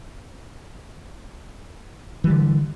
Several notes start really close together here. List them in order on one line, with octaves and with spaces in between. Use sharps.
E3 G3 D3